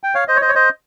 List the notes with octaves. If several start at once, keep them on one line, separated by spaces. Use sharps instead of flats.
G5
C#5 F5
C5 D#5
C#5
C5 D#5
C#5
C5 D#5